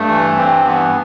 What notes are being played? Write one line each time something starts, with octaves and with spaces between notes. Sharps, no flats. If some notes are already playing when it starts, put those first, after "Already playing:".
Already playing: G2 A3
E3
G2 C4
E3 B3